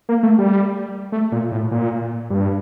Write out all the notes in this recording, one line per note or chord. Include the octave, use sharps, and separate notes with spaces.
A#3
A3
G3
A3
A#2
A2
A#2
G2